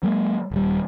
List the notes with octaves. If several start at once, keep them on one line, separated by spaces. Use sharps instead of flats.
F#3 G#3 A#3
D#1 G3